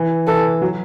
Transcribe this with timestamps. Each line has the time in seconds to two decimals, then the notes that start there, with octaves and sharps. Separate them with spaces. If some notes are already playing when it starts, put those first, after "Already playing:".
Already playing: E3
0.27 E3 A4
0.62 F#3